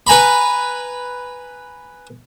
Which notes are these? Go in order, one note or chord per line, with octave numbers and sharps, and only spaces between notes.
B4 G#5 A#5 B5